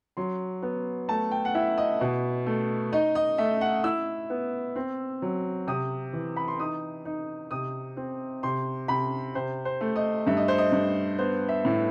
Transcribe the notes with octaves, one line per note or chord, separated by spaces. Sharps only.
F#3 C6
B3
A3 A5
G5
F#5
E4 E5
D#5
B2
A3
D#4 D#5
D#5
A3 E5
F#5
E4 E6
B3
C4
F#3
C3 D#6
E3
B5
C6
D#4 D#6
D#4
C3 D#6
C4
C3 C6
C3 B5
C3 C5
C5
A3
D#5
G2 E5
D#5
C5
D#5
G2
B3 C5
E5
A2